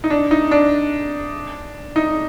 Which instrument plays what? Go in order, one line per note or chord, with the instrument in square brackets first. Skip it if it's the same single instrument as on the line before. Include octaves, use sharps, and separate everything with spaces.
[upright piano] D#4
D4
D#4
D4
D#4